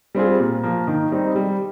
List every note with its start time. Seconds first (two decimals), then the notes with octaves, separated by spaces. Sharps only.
0.15 G3 C4 F4 G#4
0.39 A#2
0.63 F3 A#3
0.87 D#3
1.12 G3 C4 D#4
1.36 G3